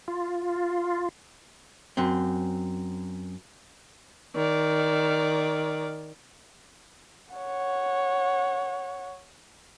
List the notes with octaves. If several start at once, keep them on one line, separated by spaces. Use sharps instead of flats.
F4
F#2 C4
D#3 D5
C#5 F#5